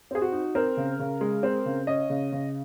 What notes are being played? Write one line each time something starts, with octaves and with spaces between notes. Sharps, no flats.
C4 G#4
F#4
D#4
C4 A#4
C#3
C#3
G#3
C4
C#3
C#4 D#5
C#3
C#3